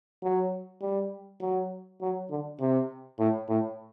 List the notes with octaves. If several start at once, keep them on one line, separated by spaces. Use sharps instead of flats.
F#3
G3
F#3
F#3
D3
C3
A2
A2